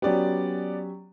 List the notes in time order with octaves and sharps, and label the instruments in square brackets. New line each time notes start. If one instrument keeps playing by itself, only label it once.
[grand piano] F#3 C#4 G4 [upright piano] B3 D5